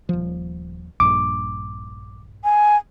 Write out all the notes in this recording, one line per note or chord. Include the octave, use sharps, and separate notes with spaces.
D#1 F3
A#1 G2 D6
G#5